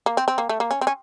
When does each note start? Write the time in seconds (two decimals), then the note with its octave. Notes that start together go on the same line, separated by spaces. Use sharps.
0.06 A#3
0.17 C4
0.28 C4
0.38 A#3
0.49 A3
0.60 A#3
0.71 C#4
0.81 C4
0.87 C#4